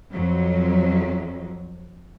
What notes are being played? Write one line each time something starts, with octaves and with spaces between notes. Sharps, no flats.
F2 F#3